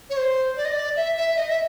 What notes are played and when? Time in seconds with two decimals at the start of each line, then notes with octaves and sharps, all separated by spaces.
0.10 C#5
0.17 C5
0.57 D5
0.65 D#5
0.72 D5
0.96 E5
1.17 E5
1.36 D#5
1.49 E5